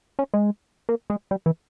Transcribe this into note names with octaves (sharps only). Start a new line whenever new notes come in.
C#4
G#3
A#3
G#3
G3
E3